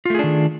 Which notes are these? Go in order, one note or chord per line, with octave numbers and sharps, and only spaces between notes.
D#3 A3 D4 F4 G#4